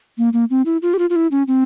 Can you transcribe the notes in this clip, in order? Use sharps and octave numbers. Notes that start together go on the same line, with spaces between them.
A#3
A#3
C4
E4
F4
G4
F4
F4
E4
C#4
C4